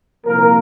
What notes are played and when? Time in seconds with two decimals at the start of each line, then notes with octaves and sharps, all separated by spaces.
0.24 C2 A#2 F3 A#3 A#4